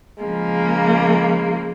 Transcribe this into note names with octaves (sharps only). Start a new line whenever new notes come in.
C#3 F3 G#3 A#3